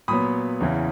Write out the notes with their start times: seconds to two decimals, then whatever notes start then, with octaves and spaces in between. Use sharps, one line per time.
0.08 A#2 F#3 B3 B5 D#6
0.60 E2 C#3 E3